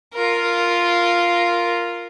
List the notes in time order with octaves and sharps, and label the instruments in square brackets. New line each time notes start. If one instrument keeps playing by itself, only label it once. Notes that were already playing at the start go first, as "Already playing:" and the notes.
[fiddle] F4 A#4